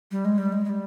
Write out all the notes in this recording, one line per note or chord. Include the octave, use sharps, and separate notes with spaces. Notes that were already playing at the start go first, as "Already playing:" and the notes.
G3
G#3
G3
G#3
G#3
G3